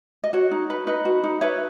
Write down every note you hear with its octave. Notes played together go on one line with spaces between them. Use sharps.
D#5
F#4 C#5
D#4
B4
D#4 B4 D#5
F#4
D#4
B4 C#5 E5